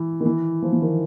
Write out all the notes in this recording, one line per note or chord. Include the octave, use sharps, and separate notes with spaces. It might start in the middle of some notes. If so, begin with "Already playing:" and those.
Already playing: E3
D#3
E3
F3
E3
D#3